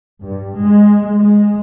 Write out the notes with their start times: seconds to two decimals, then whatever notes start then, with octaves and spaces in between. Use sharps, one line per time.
0.24 G2
0.59 G#3
1.21 G#3